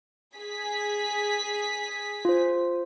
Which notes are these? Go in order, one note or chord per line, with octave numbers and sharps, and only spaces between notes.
G#4 B6
F4 C5